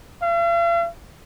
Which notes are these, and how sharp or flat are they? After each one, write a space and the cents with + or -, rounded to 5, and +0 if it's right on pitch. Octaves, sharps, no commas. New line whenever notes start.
F5 -45